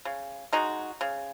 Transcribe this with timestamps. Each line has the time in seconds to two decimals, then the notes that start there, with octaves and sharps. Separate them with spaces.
0.05 C#3
0.53 G#3 D#4 F#4
1.01 C#3